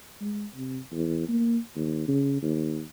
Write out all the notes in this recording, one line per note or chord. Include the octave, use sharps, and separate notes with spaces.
G#3
C3
E2
A#3
D#2
C#3
D#2